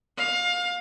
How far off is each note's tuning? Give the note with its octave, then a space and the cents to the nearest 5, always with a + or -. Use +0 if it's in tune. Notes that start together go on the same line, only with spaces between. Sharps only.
F5 +25